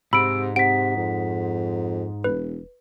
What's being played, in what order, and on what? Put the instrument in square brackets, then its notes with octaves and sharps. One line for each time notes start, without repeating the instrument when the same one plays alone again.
[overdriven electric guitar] G#2 [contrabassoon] C3 [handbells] B5 [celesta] E6 D7
[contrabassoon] C3 [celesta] F#5 B6 [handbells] D7
[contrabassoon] F2
[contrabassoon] E1 [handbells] B4